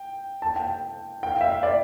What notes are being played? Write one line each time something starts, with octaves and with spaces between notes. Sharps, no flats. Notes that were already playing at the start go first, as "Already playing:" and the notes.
Already playing: G5
A5
G5
G5
F5
E5
F5
D5